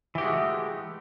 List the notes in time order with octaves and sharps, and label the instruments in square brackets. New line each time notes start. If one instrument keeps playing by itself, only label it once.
[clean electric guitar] E3
G4
F#4
G#3
A3